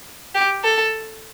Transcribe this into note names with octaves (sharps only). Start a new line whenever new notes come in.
G4
A4